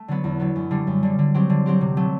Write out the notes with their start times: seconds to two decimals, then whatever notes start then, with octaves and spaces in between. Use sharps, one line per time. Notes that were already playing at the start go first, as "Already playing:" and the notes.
Already playing: A3
0.08 D3 F#3 B3
0.24 E2
0.40 D3 F#3 B3
0.56 F#2
0.71 D3 G3
0.87 F#2
1.03 D3 G3
1.19 D3
1.34 F#3 C4 G4
1.50 D3
1.66 F#3 C4 G4
1.81 C3
1.97 F#3 A3